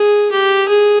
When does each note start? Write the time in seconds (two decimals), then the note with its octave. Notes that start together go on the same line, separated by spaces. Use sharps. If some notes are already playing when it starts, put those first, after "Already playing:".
Already playing: G#4
0.31 G4
0.68 G#4